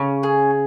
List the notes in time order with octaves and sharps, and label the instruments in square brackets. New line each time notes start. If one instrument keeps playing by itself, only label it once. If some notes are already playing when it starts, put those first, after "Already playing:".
Already playing: [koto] C#3 [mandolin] C#4
[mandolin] G#4